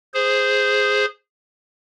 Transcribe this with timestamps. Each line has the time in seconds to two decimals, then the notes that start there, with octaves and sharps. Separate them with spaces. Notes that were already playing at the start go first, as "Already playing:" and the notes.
0.14 G#4 C5